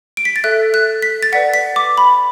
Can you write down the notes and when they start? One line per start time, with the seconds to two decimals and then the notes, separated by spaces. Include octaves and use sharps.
0.17 D7
0.25 B6
0.36 A6
0.44 A4 E5 F#6
0.74 F#6
1.02 B6
1.23 A6
1.32 B4 D5 F#5 B6
1.54 B6
1.76 D6
1.98 B5